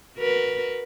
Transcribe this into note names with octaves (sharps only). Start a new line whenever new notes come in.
F#4 A#4 B4